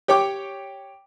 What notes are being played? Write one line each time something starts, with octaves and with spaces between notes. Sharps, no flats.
G4 C#5 G5 D6